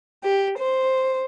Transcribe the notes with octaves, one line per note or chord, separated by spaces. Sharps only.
G4
C5